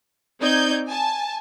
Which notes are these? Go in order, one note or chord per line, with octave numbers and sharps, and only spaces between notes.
C4 D#4 D5 G6 G#6
G#5 A5